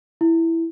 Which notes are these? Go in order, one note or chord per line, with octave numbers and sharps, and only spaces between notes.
E4